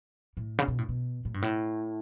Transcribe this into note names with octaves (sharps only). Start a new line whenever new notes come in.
A2
C#3
B2
A2
B2
A2
G2
A2